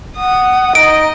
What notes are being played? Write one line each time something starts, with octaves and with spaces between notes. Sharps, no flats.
F#5 D#6
D#4 D#5 D7